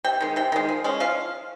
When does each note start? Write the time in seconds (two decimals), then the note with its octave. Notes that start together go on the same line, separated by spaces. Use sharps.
0.04 C3 G5
0.21 D#3 G#3
0.36 C3 G5
0.52 D#3 G#3
0.69 F3
0.84 G#3 C#4
1.00 F3 F5